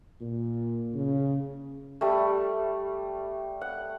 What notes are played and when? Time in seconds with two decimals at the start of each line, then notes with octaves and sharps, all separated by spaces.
0.21 A#2
0.94 C#3
2.01 G3 A3
3.61 F#5